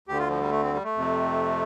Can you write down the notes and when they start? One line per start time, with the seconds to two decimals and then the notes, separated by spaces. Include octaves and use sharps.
0.08 D2 D3 G4
0.19 F4
0.30 F3
0.40 G3
0.51 A3
0.63 C4
0.73 G3
0.84 A3
0.95 F2 C3